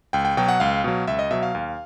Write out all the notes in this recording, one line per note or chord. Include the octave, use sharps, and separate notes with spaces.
C#2 G5
G5
B2 F#3 G5
F#5
C#2 F5
B2 F#3
C#2 E5
D#5
B2 F#3 E5
F5
D#2